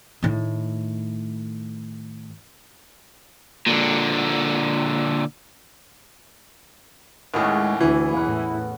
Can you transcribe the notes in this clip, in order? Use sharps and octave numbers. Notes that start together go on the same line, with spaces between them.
A2 D#3
A#2 D3
D#2 A2 G#3 B3 C#4
D2 E3 E4
E2 A2 B4 F#5